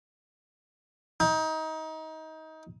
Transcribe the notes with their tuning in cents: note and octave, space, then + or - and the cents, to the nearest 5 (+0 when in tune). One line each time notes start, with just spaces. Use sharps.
D#4 +25